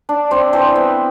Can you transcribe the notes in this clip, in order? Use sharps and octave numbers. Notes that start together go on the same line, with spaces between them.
D4
C4 D4 C5
E3 C4 C5
B3